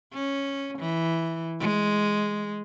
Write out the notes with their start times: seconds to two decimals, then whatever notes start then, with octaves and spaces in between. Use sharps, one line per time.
0.13 C#4
0.78 E3
1.60 G#3